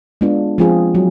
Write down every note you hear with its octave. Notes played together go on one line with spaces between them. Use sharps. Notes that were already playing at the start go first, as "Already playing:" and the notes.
G#3 B3 D4 F4
F3 G#3 C4 F4 G#4
F#3